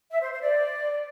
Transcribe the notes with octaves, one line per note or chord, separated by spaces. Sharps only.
E5
C5
C5
D5